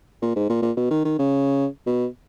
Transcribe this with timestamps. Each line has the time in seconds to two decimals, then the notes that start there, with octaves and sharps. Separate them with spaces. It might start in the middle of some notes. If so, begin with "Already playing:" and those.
0.22 A#2
0.36 G#2
0.49 A#2
0.62 A#2
0.77 B2
0.91 D#3
1.05 D#3
1.18 C#3
1.86 B2